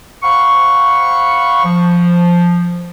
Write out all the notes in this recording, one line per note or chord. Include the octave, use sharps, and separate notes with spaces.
C5 F5 F#5 B5 C#6
F3